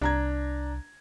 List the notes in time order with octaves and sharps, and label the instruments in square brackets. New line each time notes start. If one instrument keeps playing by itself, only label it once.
[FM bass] C2 [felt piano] D4 A#5 G#6